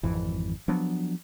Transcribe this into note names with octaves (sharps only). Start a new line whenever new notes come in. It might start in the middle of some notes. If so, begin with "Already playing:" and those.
G#1 F2 E3
F3 F#3 B3 D4